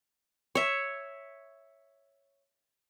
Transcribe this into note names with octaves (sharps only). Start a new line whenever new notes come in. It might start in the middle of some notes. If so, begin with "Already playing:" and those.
C#5 E5